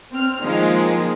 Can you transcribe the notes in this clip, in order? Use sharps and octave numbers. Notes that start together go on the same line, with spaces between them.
C4 F6
D#3 F3 G#3 A#3